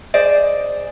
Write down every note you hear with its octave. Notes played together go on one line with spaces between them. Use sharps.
G#4 C5 D5 D#5